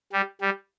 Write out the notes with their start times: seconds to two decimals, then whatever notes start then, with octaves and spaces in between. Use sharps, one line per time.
0.13 G3
0.41 G3